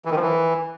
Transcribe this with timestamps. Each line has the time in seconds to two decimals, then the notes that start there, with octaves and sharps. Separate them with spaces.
0.05 E3
0.11 D#3
0.16 F3
0.21 E3